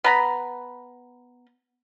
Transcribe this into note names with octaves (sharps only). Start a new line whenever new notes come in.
B3 A#5 B5